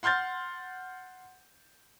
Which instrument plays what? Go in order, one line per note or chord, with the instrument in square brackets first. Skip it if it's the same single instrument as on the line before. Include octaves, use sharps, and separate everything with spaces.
[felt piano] F#5 C6 F6 G6 A6